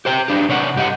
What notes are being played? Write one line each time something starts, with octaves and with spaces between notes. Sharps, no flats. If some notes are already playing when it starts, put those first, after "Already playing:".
G4 C5 G5
F#3 D4 G4
C3 C#5 D5 F#5
G2 G4 D#5 F#5